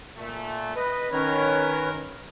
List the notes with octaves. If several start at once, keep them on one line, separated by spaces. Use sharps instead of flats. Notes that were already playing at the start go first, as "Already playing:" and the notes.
A#2 A3
B4 D#5
D#3 C#4 A#4 B4 C#5